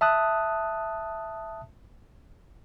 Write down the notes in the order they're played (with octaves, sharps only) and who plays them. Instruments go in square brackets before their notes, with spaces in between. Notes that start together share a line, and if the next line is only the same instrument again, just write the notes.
[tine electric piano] E5 A5 D#6 F#6